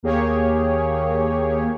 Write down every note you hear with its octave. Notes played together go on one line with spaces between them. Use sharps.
D#2 A#3 G4 G#4 C#5